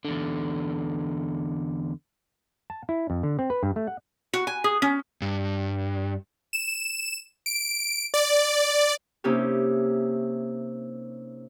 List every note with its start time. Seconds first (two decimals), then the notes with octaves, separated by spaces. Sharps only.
0.05 E2 D3
2.70 A5
2.89 E4
3.10 F2
3.23 D3
3.39 C4
3.50 B4
3.63 G2
3.76 A3
3.87 F#5
4.34 F#4
4.47 G#5
4.64 G#4
4.82 C#4
5.22 G2
6.53 E7
7.46 D7
8.14 D5
9.24 C3 A#3 C#4 D#4 E4 G4